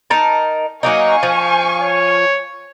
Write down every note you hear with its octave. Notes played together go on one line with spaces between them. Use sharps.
D#4 A#4 A5
F#3 A#3 D#4 F5 G#5 C#6
F3
C#5